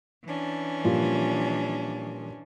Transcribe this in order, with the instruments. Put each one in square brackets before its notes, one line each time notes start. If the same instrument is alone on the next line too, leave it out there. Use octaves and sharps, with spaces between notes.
[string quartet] E3 C#4 D4
[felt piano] A#2 F3 G3